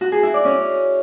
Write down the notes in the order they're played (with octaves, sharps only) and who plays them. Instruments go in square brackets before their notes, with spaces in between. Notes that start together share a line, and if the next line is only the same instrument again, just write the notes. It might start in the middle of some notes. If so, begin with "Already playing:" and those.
[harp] F#4
G#4
E4
D5
C#4